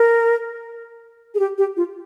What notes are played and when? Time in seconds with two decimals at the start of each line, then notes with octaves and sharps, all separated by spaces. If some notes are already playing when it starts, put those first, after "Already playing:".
Already playing: A#4
1.35 G#4
1.39 G4
1.58 G4
1.77 F4